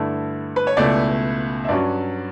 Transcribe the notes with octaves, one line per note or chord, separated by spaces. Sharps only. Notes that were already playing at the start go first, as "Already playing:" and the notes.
Already playing: G2 D3 A3 E4
B4
C#5
C#2 B2 A3 E4 D5
E5
G2 F#3 C#4 D5